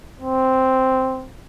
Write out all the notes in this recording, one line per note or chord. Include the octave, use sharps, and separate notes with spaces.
C4